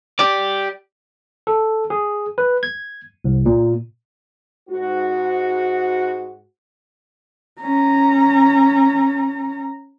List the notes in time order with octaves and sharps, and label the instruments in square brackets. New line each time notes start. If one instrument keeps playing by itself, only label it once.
[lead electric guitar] G4 D5
[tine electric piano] A4
G#4
B4
G#6
C2
A#2
[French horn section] G#2 F#4
[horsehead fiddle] C#4 A#5